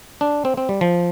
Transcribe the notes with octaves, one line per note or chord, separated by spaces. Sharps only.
D4
C4
C4
G3
F3